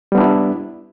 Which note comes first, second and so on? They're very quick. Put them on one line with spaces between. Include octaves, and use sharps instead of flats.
G3 B3 D4 E4